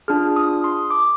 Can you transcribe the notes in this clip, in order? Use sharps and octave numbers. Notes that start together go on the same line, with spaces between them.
D4 F4 G#4 F6
D#6
C6
D6